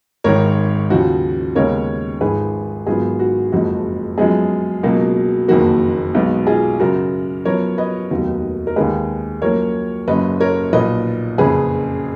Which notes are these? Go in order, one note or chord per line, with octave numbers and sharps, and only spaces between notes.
G#1 G#2 D#3 A#4 C#5
D#2 C#3 F3 F#4
D#2 C#3 G#3 B3 A#4 C#5
G#1 G#2 F3 G#4 B4
G#1 G#2 F#3 B3 F4 G#4
F#4
F#1 F2 F3 G#3 F#4
F#2 F3 G#3 B3 F4 G#4
C#2 B2 F#3 A#3
F#1 F2 D#3 A#3 F#4
B1 B2 G#3 B3
F4 G#4
F#2 C#3 F#3 F#4 A#4
F#2 F3 B3 A#4 C#5
B4 D#5
F1 D#2 D#3 F#3 B3
A#4
D#2 D#3 G#3 G#4 B4
F#2 F3 A#3 A#4 C#5
F#1 F#2 C#3 B4 D#5
A#4 C#5
B1 A#2 F3 B4 D#5
F#1 F2 C#3 G#4 B4